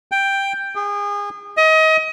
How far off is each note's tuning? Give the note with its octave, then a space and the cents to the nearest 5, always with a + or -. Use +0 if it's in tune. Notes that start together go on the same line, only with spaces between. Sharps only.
G5 +5
G#4 -30
D#5 +30